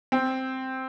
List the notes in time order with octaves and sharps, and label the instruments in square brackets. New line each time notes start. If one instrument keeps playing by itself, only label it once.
[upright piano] C4